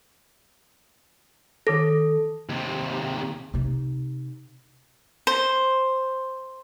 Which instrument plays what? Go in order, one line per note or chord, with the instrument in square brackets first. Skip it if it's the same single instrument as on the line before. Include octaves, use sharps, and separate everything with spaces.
[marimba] D#3 D6 A#6 [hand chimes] A4
[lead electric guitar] D#2 C3
[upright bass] C3 D#4
[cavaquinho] C5